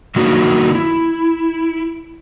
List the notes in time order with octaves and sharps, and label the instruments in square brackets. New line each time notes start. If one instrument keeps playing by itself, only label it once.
[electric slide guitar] D#3 F#3 A#3 D4 D#4 F#4
E4